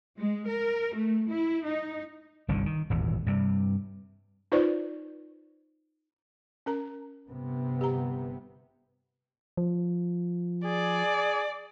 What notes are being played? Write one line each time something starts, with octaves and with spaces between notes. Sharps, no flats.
G#3
A#4
A3
E4
D#4
G1 C2 D3 D#3
D#3
D#1 G#1 E2
G2 C3 G3
D#4 F4 B4 C5 D5
C#4 A#4 A#5
G1 C3 B3
G4 A#5
F3
G#4 D5